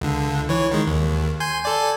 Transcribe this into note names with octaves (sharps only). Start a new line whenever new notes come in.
C#2 D3
E3 C#5
D#3 G#3
D#2
G#5 C6 G6
A4 D5 G#5